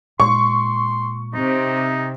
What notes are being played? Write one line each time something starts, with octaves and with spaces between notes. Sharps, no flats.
A#2 G#3 C6 C#6
C3 D#4